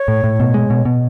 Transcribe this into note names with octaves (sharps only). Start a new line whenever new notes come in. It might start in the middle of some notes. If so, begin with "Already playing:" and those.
Already playing: C#5
A2
A2
B2
G#3
B2
B2